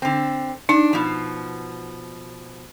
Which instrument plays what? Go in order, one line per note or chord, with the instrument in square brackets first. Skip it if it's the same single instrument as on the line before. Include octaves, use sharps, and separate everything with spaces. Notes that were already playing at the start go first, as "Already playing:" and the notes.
[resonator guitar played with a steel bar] D3 C4
[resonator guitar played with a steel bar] D4 [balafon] D#4
[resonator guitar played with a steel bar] B2 F3